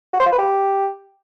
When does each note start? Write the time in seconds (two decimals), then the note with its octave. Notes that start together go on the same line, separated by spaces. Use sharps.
0.13 F#4
0.20 C5
0.26 F4
0.32 B4
0.38 G4